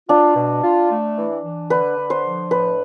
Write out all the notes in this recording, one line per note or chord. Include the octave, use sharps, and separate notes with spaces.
D4 F4
B2
F4
A3
E3
E3
D3 B4
D3
C5
F3
A2 B4